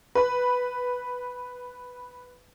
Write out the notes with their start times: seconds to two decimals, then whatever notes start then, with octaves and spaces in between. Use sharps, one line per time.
0.15 B4 B5